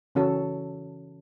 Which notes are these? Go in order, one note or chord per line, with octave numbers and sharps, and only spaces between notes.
C#3 E3 C#4 F#4 A4